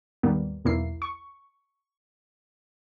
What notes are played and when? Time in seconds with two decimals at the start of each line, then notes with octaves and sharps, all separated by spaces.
0.23 D#2 G#2 G3 A#3 B3
0.65 B1 E2 A#3 E4 C7
1.02 C#6